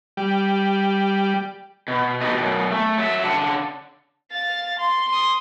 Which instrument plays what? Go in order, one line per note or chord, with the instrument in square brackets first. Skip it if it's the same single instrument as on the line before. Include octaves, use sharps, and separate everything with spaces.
[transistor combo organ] G3
[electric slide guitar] B2
D#4 F#4 G4 A4 B4 D#5
F#2 B2
A3
F#3 E5
C#3 D4 F#5 A5
[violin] F5 A6
C6
C6 D#6